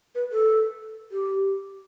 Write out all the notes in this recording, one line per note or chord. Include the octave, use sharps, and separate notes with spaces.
B4
A4
G4